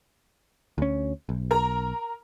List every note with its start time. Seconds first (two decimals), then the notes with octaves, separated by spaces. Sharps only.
0.78 D2 C#4
1.29 B1
1.51 A#4 A#5